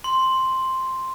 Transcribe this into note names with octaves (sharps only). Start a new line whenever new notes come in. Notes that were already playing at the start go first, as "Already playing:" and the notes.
C6